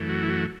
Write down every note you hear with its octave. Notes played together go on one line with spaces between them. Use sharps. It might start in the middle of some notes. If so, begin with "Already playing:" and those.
Already playing: F#2 E3 A3
F#4
E4
F#4